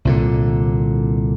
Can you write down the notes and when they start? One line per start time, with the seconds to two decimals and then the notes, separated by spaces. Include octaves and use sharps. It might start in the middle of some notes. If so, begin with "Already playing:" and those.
0.05 C2 A#2 D3